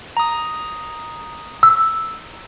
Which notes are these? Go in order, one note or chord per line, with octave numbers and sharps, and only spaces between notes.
A#5 D#6
E6